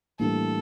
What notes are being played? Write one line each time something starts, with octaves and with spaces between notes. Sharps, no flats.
A2 E3 G3 A#3 D4 A4